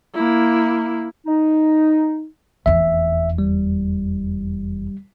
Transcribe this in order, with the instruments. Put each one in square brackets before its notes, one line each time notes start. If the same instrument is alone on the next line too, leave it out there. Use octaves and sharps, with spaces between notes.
[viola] A#3 E4
[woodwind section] D#4
[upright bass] F1 E2 [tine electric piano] E5
[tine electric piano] G3